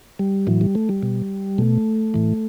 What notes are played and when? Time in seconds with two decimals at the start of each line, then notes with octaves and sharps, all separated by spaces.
0.19 G3
0.47 A2 E3 F#3
0.61 G3
0.75 A3
0.89 G3
1.03 B2
1.58 B2 A3
2.14 A2 E3